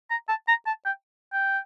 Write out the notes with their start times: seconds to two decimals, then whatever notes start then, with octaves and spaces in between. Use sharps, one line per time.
0.10 A#5
0.29 A5
0.48 A#5
0.66 A5
0.85 G5
1.33 G5